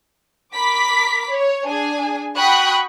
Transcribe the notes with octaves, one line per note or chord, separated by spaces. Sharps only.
A#4 B5 D6 B6
C#5
D4 G#4 G#5
F#4 G5 B5 C#6 D#6 F#6